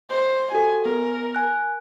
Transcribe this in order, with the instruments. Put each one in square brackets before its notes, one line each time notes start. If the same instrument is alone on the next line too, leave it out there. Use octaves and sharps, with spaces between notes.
[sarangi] C5
[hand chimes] F#4 G4 A4 [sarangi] G#5
[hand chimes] B3 [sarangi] A#4
[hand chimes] G#5 F#6